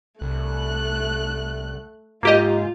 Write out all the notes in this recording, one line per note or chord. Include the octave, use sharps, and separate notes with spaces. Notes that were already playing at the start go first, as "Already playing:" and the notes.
C2 A3 F#6
G#2 A#3 F4 G4 D#5